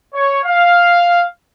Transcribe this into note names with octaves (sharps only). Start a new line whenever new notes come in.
C#5
F5